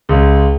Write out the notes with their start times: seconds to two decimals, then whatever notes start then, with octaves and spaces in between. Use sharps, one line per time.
0.09 C#2